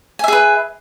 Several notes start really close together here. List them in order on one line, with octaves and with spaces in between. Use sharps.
G#5 E5 G#4 B4